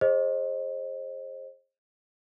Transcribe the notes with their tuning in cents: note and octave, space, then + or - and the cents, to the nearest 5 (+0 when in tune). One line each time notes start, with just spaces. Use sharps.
G#4 +0 C5 +30 D#5 -5